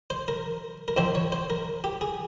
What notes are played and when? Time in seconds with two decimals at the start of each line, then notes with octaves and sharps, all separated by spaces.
0.10 C5
0.28 A#4
0.88 A#4
0.97 G#2 F3 C4 C5
1.15 C#5
1.32 C5
1.50 A#4
1.84 G4
2.01 G#4